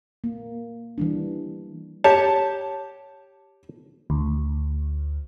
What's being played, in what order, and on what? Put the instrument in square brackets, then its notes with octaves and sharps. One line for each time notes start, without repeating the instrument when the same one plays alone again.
[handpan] A#3
E3 G3 D4
[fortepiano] G4 A5 [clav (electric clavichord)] C#5
[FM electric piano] D2